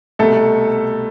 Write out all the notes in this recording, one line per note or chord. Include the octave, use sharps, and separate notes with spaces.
C2 B2 A3 A4